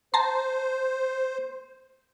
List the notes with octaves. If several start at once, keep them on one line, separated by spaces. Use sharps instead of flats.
C5 A5 A#5 C6